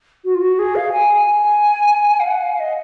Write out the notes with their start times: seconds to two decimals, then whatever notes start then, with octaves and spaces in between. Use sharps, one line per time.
0.25 F#4
0.35 F4
0.41 F#4
0.59 G#4
0.76 F5
0.92 G#5
1.26 G#5
2.20 F5
2.27 F#5
2.43 F5
2.53 F5
2.60 D#5